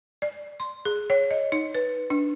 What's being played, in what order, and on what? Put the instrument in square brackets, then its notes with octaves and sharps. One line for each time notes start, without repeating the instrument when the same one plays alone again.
[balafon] D5
C6
G#4
C#5
D#5
D#4
B4
D4